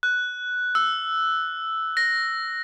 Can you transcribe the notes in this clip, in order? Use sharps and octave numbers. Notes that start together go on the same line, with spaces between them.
F#6
E6
A#6